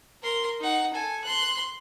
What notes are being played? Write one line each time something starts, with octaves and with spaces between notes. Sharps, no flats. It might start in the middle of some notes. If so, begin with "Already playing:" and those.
A#4 C6
D#4 F#5
A4 G#5
C6 F#6